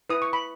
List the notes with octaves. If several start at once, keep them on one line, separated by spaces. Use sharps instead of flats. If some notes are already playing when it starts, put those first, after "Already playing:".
E4 B4 D#6
C#6
B5